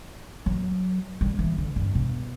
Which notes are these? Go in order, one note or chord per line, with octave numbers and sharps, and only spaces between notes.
F#3
G3
E3
D3
G2
B2